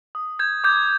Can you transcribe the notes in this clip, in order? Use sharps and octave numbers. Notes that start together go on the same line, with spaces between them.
D#6
G6 G#6
D6 G6